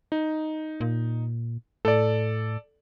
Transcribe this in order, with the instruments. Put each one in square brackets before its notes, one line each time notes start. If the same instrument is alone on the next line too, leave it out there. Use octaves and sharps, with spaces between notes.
[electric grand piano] D#4
[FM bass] A#2
[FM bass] A2 [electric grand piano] A4 D5